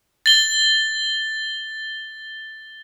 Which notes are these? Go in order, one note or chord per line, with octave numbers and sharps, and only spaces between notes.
A6 G7